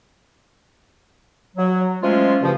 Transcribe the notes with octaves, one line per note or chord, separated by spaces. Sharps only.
F#3
F3 G#3 A3 C#4 F4
G2 C#3 F3